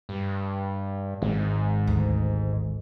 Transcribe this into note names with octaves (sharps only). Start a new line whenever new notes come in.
G2
G#1 G#2
D2